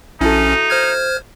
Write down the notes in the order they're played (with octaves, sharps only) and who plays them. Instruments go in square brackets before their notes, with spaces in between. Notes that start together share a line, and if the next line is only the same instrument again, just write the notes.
[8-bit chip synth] A#1 C#4 [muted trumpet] D#4 [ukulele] E4 F#4 A4
[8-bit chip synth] C5 F6 G#6